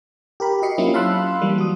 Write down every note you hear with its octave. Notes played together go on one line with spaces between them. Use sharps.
G4 A#4 B5
F#4 D#5 C7 C#7
F#3 A#3 C4 C#4 E4 F4
F5 A5 B5 C6 E6 F#6
E3 F#3 G3 A#3
F#4 D#6